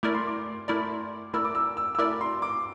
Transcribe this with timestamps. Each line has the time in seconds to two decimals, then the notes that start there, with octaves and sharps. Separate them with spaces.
0.03 A3 E4 A#4 D5 D6
0.14 C6
0.27 D6
0.68 A3 E4 A#4 D5
1.34 A3 E4 A#4 D5 E6
1.45 D6
1.55 E6
1.77 E6
1.95 E6
1.98 A3 E4 A#4 D5 D6
2.21 C6
2.42 D6